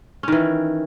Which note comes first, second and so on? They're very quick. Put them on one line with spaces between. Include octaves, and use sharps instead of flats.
C#4 D#3 E3